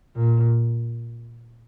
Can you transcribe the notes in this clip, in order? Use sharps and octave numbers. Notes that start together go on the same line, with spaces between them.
A#2